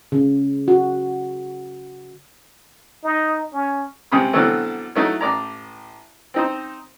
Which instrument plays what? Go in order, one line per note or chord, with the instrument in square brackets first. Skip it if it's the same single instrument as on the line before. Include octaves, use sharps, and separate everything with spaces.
[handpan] C#3
F#4
[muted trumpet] D#4
C#4
[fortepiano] C#2 C3 B5 D#6
B2 D3 E3 F#3 A3 C4
F#3 A3 D#4 E4
A1 D5 A#5
C4 D#4 C5